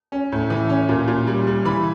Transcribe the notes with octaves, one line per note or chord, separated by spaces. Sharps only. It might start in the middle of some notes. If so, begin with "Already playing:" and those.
C#4
A2
E3
C#4
A#2
A#2
G3
G3
E3 B5